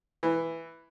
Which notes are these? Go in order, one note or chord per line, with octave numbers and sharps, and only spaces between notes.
E3